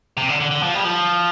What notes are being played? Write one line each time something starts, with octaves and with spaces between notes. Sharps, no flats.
C3
D3
D3
D3
F3
G3
F3